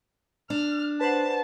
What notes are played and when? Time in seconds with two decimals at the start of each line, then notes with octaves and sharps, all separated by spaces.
0.50 D4 F6
1.01 B4 C5 F#5 A5